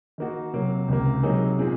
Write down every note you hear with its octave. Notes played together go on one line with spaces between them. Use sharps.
D#3 A#3 D#4 F#4
C3 F#3 A#3
C#2 C3 D#3 A#3
C3 F#3 A#3 D#4 G#4
A#2 G#3 C4 D#4